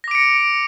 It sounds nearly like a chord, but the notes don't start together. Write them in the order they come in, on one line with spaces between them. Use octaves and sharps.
A#6 D6 D7 C#7